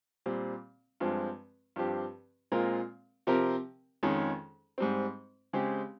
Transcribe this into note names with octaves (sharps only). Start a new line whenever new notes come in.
A#2 G3 C4
G2 F3 G#3 C4
G2 F3 C4 G4
A#2 G#3 C4 F4 A#4
C3 F3 C4 G4 A#4
F2 D#3 G#3 C#4 G#4
G#2 G3 C4
C#3 G#3 C4 G4